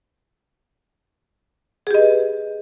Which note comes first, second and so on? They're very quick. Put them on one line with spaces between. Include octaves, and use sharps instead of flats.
G#4 G4 D#5 B4